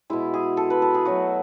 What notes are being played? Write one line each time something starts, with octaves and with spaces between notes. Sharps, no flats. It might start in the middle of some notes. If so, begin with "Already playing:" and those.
B2 G#3 E4
G#4
A4
B4
A4
G#4
B2 F#3 A3 F#4